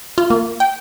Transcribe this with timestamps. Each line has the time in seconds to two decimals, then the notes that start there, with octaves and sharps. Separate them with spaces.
0.18 F4
0.30 A#3
0.60 G5